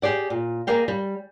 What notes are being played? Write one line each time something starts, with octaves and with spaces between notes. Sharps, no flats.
G4 G#4 D5 F#5
A#2
A#3 G#4 A#4 D5 F5 G5
G3